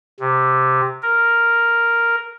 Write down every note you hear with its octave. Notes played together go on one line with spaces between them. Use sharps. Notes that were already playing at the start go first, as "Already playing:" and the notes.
C3
A#4